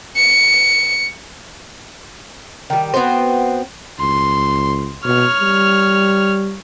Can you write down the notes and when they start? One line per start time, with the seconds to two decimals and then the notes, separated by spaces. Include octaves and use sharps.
0.17 C#7
2.70 D#3 G3
2.94 B3 C4 F#4 C5
3.99 C#2 C6
5.05 B2 C#5 F6
5.40 G3